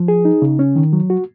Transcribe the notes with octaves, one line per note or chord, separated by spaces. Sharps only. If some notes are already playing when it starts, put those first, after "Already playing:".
Already playing: F3
G#4
D#4
C#3
C#4
D#3
F#3
F#4